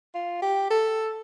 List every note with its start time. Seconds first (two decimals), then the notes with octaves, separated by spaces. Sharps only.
0.14 F4
0.42 G4
0.70 A4